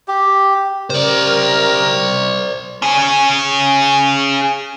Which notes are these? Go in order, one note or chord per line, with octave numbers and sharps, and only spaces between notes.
G4
C#3 G4 A#4 C5 D5
C#4 G#4